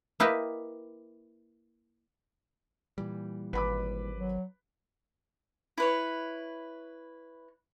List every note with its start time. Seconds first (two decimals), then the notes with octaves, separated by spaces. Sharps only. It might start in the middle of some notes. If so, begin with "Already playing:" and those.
0.20 A#3 E4 G4 B4 D#5
2.98 A#2 E3 G3
3.53 G#1 B4 B5 D6
4.17 F#3
5.78 E4 B4 C#5